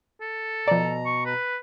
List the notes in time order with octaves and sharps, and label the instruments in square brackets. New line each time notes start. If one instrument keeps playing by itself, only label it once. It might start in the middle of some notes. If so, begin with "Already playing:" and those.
[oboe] A4
[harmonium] B2 A#5 [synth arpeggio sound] F3 D5
[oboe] C#6
B4